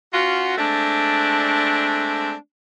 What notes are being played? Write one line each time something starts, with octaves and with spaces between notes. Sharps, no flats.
C#4 F4 F#4
G#3 A3 C4 D4